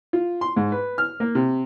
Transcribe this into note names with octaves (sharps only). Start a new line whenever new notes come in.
F4
C6
G#2
B4
F6
A#3
C3